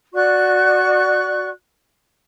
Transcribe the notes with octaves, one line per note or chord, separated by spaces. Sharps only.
F#4 D5 C#6 F#6